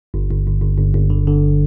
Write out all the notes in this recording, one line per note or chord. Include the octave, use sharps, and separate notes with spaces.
G1
G1
G1
G1
G1
G1
D3
D3